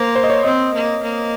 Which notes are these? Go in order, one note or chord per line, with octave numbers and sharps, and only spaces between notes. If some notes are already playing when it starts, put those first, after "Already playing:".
Already playing: A#3 C5
C5
D#5
C#5
C4 D#5
A#3
A#3